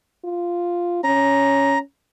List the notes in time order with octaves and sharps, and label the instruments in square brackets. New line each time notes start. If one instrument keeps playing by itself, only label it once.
[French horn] F4
[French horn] C#4 [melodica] A#5